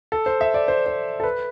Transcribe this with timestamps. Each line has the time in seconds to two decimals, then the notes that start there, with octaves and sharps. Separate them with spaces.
0.12 A4
0.26 C5
0.41 E5
0.54 D5
0.68 C5
0.86 C5
1.20 A4
1.24 B4